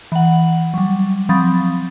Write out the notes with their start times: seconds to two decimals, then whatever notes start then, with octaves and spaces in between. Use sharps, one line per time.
0.12 E3 F#5
0.74 F#3 G3
1.29 F3 F#3 C4 B5 D#6 A6